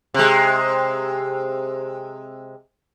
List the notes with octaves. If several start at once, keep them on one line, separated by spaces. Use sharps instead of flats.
C3 G#3